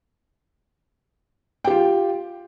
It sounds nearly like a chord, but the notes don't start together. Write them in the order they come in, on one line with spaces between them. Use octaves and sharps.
G5 G4 F4